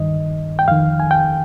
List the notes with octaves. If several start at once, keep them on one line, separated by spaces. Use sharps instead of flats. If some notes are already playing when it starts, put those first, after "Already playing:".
Already playing: G2 D#3 D#5
G5
F2 D#3 F5
G#5
G5